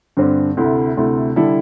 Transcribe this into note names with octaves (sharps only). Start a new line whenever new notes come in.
G2 D3 C4
D2 C3 A3 E4
D2 C3 A3 E4
D3 G3 E4 A4